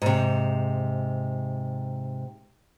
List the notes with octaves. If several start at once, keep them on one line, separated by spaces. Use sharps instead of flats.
G#2 C3